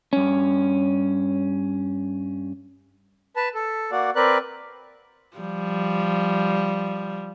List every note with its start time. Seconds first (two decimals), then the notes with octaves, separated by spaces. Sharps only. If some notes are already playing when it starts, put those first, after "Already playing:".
0.13 G2 C#4
3.36 B4 A5
3.55 A4
3.92 A#3 F#4 D5
4.16 C4 A#4 B4 D5 F#6
5.37 F3 G3